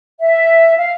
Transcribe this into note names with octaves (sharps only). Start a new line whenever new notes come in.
E5
F5